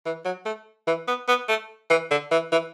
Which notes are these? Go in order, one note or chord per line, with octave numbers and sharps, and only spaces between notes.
E3
F#3
A3
E3
B3
B3
A3
E3
D3
E3
E3